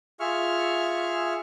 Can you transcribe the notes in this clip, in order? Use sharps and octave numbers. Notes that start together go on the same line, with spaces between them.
F4 G#4 E5 C#6 F6